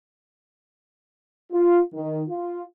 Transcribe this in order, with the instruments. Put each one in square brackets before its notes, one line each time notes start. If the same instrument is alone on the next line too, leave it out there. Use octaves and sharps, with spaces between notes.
[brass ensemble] F4
D#3
F4